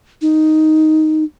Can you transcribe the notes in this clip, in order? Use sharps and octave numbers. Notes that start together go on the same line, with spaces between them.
D#4